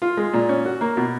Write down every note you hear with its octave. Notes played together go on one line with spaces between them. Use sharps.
F4
G#3
A#2
C#4
F#4
A#3
B2